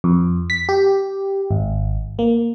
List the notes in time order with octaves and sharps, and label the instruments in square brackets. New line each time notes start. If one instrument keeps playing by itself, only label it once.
[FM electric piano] F2
B6
G4
G#1
A#3